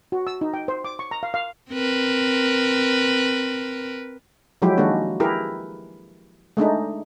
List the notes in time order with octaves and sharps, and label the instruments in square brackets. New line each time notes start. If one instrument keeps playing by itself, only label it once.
[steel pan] F#4
E6
D#4
G5
C5
D6
C#6
A#5
F5
F5
[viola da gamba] C4 A#4 B4
[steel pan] F3 F#3 G#3 E4 G4
D#3 G#3 A#3 D4 F#4
E4 G4 G#4 A#4 B4
G#3 A3 D4 D#4